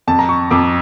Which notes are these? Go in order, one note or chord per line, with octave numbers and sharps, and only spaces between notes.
F2 A5
A#5
C#6
F2 D6